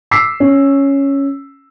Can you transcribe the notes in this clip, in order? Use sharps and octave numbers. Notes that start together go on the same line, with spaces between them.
D6 E6 B6 C7
C#4